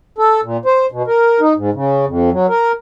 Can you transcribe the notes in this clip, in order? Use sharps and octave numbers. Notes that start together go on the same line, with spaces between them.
A4
A#2
C5
B2
A#4
D#4
G#2
C#3
F2
F#3
A#4